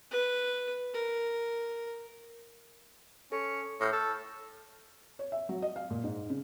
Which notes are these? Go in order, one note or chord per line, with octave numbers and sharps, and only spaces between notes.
B4
A#4
C#4 A4
A2 C#6 F6 G6
A4
C#5
E5
F#3
D#5
F5
A#2
G#2
C#3